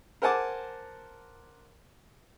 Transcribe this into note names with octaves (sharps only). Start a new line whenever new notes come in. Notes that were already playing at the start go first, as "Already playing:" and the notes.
A#4 C5 F#5 G#5 A5 D6